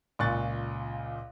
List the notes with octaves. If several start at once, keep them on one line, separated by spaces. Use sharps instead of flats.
C#2 A#2 C#6 F#6 A6